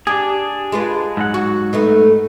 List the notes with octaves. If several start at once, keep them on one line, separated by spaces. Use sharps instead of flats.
D4 G4 G#4
G#3 F4 B4
G#2 F#3 F#5
F#4
A3 B3 D#4